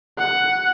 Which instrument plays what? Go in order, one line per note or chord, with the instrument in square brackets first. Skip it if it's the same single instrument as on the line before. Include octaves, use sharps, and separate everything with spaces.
[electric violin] F#5